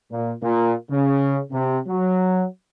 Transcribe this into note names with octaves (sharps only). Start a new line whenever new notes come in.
A#2
A#2
C#3
C3
F#3